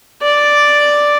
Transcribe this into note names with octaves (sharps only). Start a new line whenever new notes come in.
D5